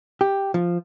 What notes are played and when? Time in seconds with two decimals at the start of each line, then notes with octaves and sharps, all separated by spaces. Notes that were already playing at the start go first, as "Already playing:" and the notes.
0.21 G4
0.54 F3